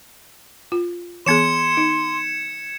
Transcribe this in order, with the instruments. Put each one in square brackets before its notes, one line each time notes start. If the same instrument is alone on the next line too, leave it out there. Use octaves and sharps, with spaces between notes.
[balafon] F4
[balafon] E3 B3 G#4 [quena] C6 [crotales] G#6 C#7 E7
[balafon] D#4